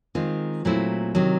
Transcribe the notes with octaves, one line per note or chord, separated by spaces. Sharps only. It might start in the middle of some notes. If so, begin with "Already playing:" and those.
D#3 G#3 C4 F4
A#2 F#3 A3 C4 E4
C3 D#3 F#3